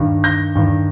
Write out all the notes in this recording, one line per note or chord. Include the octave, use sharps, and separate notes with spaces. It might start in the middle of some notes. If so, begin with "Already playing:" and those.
Already playing: G2 D#3
G6 A#6
G2 D#3